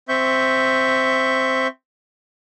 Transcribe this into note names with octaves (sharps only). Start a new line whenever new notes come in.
C4 E5 C#6 G6